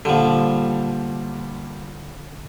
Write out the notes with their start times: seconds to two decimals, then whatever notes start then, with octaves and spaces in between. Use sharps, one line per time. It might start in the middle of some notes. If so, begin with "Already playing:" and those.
0.05 A#2 D3 F3 G3